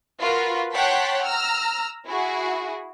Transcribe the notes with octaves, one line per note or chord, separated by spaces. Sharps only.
F4 F#4 A#4 B4
C#5 F#5 G5 A5 C6 B6
A#5 E6 F6
E4 F#4 G#4